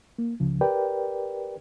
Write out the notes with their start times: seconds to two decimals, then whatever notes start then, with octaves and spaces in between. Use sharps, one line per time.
0.18 A#3
0.40 C#2 C#3 F3
0.61 G4 A#4 B4 D5 G5